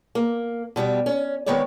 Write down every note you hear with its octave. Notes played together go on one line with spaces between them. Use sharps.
A#3
B2 G3 G4
C#4
D#3 G#3 B3 C4 C#5 D5